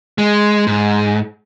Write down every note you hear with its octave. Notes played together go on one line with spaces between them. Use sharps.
G#3
G#2